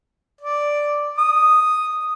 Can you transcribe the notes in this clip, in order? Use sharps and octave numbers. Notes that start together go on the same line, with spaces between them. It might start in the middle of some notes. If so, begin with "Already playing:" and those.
D5
D#6